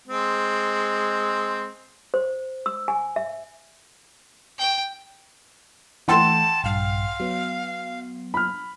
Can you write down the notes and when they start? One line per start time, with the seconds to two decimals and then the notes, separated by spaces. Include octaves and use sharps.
0.07 G#3 C4
2.14 C5
2.66 E6
2.88 G#5
3.16 E5
4.59 G5
6.08 E3 A3 F#5 G5 A5 C6
6.64 A#1 G2 F5
7.20 F#3 B3
8.34 B5 F6